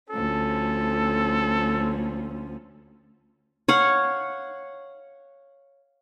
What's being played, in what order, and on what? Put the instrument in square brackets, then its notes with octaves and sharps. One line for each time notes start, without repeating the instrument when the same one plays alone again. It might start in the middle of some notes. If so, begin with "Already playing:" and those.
[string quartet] D2 F3 C#4 [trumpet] A4
[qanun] C#5 F5 F#5